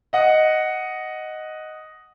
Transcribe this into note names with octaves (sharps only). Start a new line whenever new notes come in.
D#5 F#5